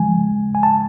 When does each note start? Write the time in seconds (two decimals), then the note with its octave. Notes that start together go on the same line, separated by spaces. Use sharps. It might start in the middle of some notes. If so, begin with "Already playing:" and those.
Already playing: C#3 F3 G#3 G#5
0.55 G#5
0.63 A5